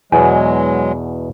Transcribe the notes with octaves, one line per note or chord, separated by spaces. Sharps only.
E2 B2 F#3 G#3 G#5